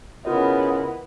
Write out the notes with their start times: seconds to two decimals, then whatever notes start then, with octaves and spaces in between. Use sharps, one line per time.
0.25 C#3 B3 E4 F4 A#4 D#5